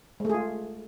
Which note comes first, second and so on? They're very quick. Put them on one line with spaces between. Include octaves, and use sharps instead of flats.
G#3 A3 G#4 F4